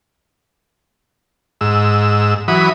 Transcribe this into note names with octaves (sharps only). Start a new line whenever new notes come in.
G#2 E6
E3 F#3 B5 D#6